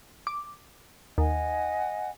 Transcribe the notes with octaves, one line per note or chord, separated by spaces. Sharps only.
D6
D#2 D#5 F#5 G#5